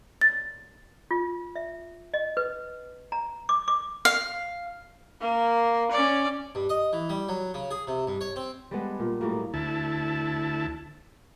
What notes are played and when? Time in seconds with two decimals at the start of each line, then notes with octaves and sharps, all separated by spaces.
0.21 A6
1.11 F4
1.56 E5
2.14 D#5
2.37 B4
3.12 A#5
3.49 D6
3.68 D6
4.05 F5
5.21 A#3
5.91 C#4 D5
6.55 G2
6.69 D#5
6.93 E3
7.09 G3
7.29 F#3
7.54 C#3
7.71 G#4
7.87 C3
8.07 G2
8.21 C#5
8.36 C4
8.71 G3 G#3 B3 D4
9.00 A#2
9.21 A2 F#3 G3 A#3
9.54 D2 E4 A5